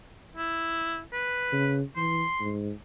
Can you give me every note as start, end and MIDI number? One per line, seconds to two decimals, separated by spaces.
0.37 1.01 64
1.13 1.77 71
1.52 1.82 49
1.97 2.24 52
1.97 2.51 84
2.40 2.71 44